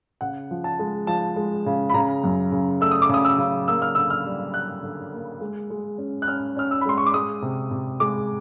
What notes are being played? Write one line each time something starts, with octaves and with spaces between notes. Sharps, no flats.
C#3 F#5
F3
A5
G#3
F3 A5
G#3
C#3
B5
C#3 A#5
F#2
C#3
A3 E6
D#6
D6
C#3 D#6
E6
C#3
A#3 E6
F6
D3 E6
F6
G3
G3 F#6
D3
A#3
G#3
G#3
C#4
F#6
C#4 F6
C#4 F6
E6
B5
G#3 C6
C#6
D6
G#3 D#6
C3
C3
G#3 D6